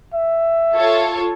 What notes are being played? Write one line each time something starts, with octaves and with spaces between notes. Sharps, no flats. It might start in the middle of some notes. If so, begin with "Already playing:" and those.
E5
F4 A4 C#5